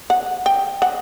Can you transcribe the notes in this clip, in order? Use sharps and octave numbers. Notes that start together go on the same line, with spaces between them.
F#5
G5
F#5